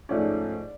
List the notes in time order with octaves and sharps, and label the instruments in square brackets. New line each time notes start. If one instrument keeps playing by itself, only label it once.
[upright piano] G#2 F3 A3 C#4 D5